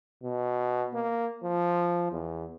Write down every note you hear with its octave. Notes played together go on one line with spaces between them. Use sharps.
B2
A#3
F3
E2